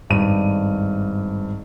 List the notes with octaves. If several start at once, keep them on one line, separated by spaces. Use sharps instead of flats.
G#1 G2 D#7